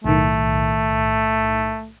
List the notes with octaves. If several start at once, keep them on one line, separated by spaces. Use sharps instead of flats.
B1 A2 D#3 A3